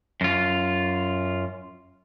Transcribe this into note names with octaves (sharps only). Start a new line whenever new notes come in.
F#2 F4